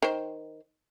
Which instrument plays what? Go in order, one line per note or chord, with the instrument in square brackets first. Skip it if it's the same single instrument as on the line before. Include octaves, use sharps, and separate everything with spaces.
[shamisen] D#3 C5